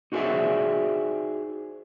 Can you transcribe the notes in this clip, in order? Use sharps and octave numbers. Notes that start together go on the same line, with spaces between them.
D#4 F#4 G#4 C5 D5 E5